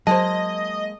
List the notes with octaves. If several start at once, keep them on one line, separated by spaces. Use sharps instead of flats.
F#3 G#3 A#3 C5 D#5 A5